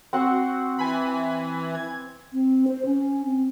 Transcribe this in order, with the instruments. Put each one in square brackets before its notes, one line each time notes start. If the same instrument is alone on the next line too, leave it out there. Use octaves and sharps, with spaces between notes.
[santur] C4 [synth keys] F#4 F#5
[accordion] E3 [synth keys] G#5 B5
[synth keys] G#6
[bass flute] C4
C5
C#4
C4